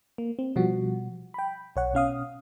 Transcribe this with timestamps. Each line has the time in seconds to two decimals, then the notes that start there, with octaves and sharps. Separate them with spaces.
0.18 A#3
0.39 C4
0.56 B2 F3 G3 F#4
1.34 G5 B5
1.76 B1 C#5 F#5
1.94 B2 C#4 F5 D#6